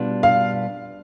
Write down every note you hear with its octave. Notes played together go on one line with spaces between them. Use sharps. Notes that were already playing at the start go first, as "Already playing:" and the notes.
Already playing: B2 G3 B3 D4 F4
F5